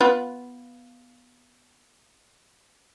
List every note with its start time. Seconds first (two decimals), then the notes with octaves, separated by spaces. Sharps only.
0.01 B3 F4 B4